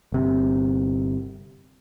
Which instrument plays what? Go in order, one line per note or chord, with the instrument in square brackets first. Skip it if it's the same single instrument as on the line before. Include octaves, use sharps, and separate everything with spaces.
[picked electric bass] G1 C3